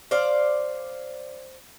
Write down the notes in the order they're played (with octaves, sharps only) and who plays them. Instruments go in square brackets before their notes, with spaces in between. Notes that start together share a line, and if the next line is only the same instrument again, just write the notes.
[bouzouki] C5 D5 F5